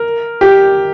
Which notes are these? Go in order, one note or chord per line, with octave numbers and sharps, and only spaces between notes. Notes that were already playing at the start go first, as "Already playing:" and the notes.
Already playing: A#4
G4